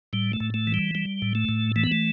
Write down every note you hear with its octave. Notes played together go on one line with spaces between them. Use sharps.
A2 G3
A3
A2
A3
E3
G3
G3
A2
A3
A2
E3 A3
B3
A3